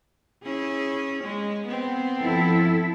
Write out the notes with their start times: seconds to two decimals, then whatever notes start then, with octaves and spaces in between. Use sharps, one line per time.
0.43 C#4 E4 G#4
1.24 G#3
1.67 B3 C4
2.22 F3 E4 A4